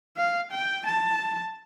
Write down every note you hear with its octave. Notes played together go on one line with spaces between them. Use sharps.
F5
G5
A5